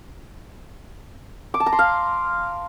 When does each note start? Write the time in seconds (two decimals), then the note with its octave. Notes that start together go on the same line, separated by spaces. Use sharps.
1.54 D6
1.60 A5
1.66 A#5
1.73 C6
1.79 F5